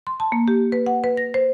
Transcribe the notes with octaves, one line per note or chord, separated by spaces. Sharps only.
C6
A5
A#3
G4
B4
F#5
B4
A#6
C5